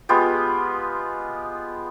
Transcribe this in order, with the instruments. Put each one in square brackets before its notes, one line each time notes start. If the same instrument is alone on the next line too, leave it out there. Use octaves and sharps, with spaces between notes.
[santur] G#3 B3 F4 G4